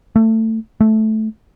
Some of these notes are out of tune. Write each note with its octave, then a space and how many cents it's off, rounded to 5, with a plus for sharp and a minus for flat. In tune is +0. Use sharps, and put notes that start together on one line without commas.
A3 +20
A3 -10